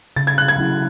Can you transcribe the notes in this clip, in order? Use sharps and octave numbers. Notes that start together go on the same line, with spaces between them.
C#3 A6
G#6
F#6
G#6
F#3 C#4 E4